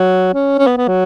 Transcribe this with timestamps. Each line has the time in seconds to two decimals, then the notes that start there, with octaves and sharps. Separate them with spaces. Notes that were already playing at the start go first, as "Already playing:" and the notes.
Already playing: F#3
0.34 C#4
0.59 C#4
0.67 B3
0.77 B3
0.88 F#3